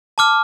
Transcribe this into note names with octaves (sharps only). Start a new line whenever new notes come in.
A5 D6 F6